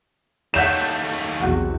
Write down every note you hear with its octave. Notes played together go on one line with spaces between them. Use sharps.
D#2 A3 C#5 E5 F#5 G6 E7
B1 E2 C3 F#4